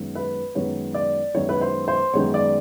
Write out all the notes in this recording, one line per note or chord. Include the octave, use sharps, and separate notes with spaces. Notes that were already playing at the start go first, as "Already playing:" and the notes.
Already playing: F#2 D#3 G#3 B3
B4
F#2 D#3 G#3 B3 C#5
D5
F#2 D#3 G#3 B3 C#5
B4
C5
C5
F#2 D#3 G#3 B3 C#5
D5